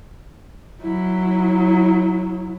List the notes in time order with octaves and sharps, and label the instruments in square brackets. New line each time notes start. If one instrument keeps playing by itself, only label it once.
[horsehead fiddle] F#3 E4